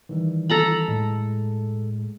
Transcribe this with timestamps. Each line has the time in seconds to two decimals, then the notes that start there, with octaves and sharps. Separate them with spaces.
0.09 D#3 E3 G3
0.49 A4 A#5 B5
0.88 A2 G#3